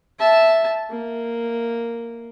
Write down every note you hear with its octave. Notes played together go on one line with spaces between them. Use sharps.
E5 A5
A#3